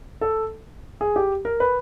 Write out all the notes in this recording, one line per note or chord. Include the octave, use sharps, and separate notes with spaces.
A4
G#4
G4
A#4
B4